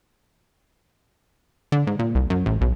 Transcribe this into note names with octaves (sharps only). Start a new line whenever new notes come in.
D3
G#2
A#2
C2
F#2
A1
B1